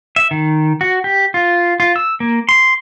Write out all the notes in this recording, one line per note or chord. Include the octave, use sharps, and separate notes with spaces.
E5
D#3
F#4
G4
F4
F4
E6
A#3
C6